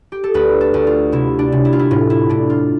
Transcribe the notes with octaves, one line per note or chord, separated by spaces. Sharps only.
G4
A4
D2 B4
A4
D2
F4
C3 E4
D4
C3
E4
F4
E4
A2 F4
E4
A2 D4
F4